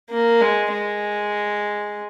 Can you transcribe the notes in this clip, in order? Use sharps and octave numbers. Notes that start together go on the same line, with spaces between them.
A#3
G#3
G#3